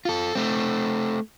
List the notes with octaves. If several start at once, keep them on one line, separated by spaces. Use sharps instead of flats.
F4 A4
A3 C4